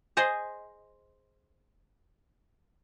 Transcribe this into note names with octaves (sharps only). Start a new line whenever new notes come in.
G#4 C5 D#5